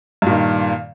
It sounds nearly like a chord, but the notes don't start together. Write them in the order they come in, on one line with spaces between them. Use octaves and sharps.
G2 A#2 D#3